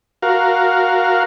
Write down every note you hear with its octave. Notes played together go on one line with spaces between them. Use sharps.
F#4 A#4 F5